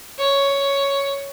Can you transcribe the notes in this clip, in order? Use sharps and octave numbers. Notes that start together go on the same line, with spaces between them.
C#5